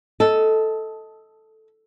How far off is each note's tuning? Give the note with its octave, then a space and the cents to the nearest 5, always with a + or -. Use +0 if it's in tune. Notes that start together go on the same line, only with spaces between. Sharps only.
A4 +0 D#5 +20